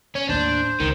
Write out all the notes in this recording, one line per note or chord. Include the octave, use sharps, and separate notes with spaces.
C#4
D#2 A2 D4 C5
C#2 D#3